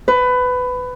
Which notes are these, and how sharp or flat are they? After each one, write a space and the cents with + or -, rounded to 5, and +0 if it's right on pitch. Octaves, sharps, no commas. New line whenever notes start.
B4 +20